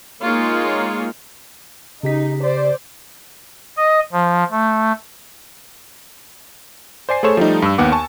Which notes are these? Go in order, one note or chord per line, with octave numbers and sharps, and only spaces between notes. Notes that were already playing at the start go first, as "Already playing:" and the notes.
G#3 A#3 D#4 F4 G#4 C#5
C#3 D#4 G4 B6
C5 D5
D#5
F3
A3
C5 D5 G#5 C7
A3 G#4 A4 C5 C#5 E7
F3 G3 A3 D#4
G2 E6
D#2 B3 F#5 D6
G#5 A5 C#6